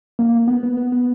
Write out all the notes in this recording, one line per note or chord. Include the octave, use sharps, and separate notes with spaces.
A#3
A#3
B3
B3
B3
B3